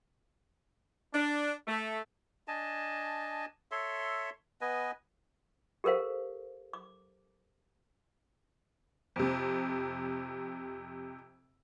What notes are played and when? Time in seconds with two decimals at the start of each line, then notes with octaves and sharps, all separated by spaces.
1.14 D4
1.68 A3
2.48 D4 D#5 G#5 A5
3.71 A4 C#5 E5 C6
4.61 B3 B4 D#5 G#5
5.84 G4 A4 A#4 C5 F5
6.73 D6
9.16 F2 C3